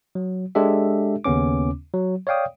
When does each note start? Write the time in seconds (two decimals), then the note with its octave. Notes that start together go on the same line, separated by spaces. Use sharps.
0.15 F#3
0.55 G#3 D4 G4 A4 E5
1.24 D#2 C#3 B3 C#4 D6
1.94 F#3
2.27 C#5 D5 F5 G5 D#6